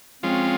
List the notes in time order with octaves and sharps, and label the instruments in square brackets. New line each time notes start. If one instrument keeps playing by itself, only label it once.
[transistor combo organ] F3 G#3 C#4 F4 [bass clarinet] C4